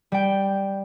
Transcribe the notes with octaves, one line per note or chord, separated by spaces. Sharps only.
G3 G5